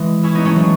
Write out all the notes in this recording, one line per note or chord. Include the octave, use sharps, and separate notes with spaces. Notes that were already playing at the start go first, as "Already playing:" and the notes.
Already playing: E3 G#3
C#4 E4
B3 D#4
A3 C#4
F#3 A3